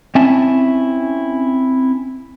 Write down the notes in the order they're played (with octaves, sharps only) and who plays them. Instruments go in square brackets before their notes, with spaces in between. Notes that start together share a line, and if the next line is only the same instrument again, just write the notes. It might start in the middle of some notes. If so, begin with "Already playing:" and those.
[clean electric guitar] C4 C#4 E4 E5 G#5 A5